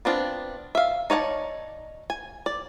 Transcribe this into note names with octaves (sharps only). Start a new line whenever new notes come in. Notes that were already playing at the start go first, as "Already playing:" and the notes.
B3 C4 D4 F4
E5 F5
D#4 C#5 D5 F#5 A5
G#5
D5